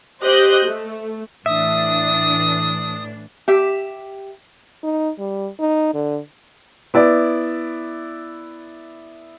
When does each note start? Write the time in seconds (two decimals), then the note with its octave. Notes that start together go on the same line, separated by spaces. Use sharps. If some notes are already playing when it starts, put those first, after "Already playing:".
0.23 G4 C5 D#5 F#6 G6
0.67 A3
1.46 A2 E3 D4 E5 D#6
3.48 G4 E5
4.84 D#4
5.19 G3
5.59 D#4
5.94 D3
6.94 B3 E4 D5